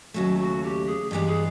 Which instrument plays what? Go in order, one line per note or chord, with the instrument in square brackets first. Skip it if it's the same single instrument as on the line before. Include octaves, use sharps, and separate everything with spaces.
[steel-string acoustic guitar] D#2 C#3 F#3 A3 [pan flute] F#4
[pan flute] F#4
G4
G#4
[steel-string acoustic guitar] G2 E3 G#3 B3 [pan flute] G4
[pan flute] G#4